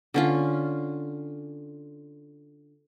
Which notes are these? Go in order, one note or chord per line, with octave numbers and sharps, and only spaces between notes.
D3 C#4 F4